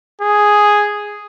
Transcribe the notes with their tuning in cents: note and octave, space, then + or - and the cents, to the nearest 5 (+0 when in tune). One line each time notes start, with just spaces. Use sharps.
G#4 +0